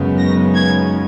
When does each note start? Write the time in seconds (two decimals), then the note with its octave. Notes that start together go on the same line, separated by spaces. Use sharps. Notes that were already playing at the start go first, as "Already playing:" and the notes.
Already playing: F#2 C#3 G#3 B3 D#4
0.19 A#6
0.55 G#6